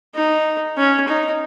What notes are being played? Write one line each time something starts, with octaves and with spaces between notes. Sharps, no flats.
D#4
C#4
D#4